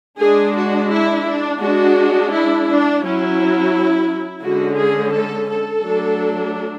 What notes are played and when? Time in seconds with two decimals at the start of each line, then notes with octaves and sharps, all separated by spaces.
0.20 G#3 D4 G#4
0.55 F#4
0.90 E4
1.26 D4
1.61 G#3 D4 F#4
2.31 E4
2.67 D4
3.02 F#3 C#4 E4
4.43 D3 G#3 C#4 F#4
4.77 G#4
5.13 A4
5.49 A4
5.83 F#3 A3 D4